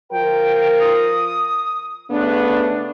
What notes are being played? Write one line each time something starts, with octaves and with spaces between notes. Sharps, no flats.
F3 F4 A#4 G5
D#6
C#3 A3 B3 D4